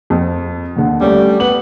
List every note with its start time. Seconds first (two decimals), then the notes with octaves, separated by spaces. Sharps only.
0.10 F2
0.76 D#2 D3
1.01 G3 A3 C#4
1.40 B3 F#7